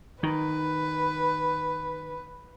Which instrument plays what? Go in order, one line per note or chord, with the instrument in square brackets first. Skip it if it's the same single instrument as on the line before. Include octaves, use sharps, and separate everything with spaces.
[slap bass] D#3 [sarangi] B4